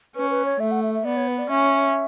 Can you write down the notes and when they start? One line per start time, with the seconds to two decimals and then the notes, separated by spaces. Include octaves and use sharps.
0.16 C#4 B4
0.30 B4
0.45 C#5
0.60 A3 E5
0.71 F#5
0.83 E5
0.94 E5
1.05 B3 D5
1.17 C#5
1.28 B4
1.39 D5
1.49 C#4 E5